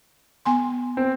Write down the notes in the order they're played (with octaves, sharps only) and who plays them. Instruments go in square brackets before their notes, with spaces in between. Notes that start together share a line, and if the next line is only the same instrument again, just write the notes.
[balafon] B3 G#5 C6
[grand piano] C4